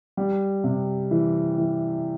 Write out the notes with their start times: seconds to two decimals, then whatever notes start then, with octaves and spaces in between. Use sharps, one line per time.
0.17 G3
0.64 C3
1.11 E3
1.58 E3